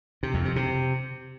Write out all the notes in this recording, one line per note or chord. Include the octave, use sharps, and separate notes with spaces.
C3
F2
C3
C3